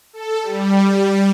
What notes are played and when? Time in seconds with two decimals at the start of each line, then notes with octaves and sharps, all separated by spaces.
0.13 A4
0.42 G3